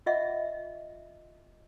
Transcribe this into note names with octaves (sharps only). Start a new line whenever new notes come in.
F4 D#5 E5 F#5